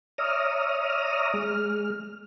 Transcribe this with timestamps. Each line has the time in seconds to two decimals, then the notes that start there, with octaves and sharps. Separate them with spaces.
0.18 C#5 D5 E5 A#5 D#6 F6
1.34 G#3 F6